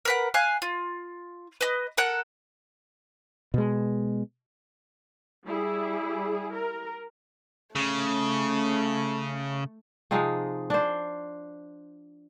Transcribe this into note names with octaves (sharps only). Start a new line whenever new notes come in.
A#4 B4 F#5
F5 G#5 F#6
F4
B4 D#5
A4 A#4 F#5 F#6
B2 G#3
G3 E4 G#4
A#4
C#3 A3
C3 F3 G#3 D#4
D4 C5